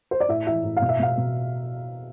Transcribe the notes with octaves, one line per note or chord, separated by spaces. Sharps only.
C5
D5
A2 E5
E3 E5
A2
F5
B2
E5
B2 F5
B2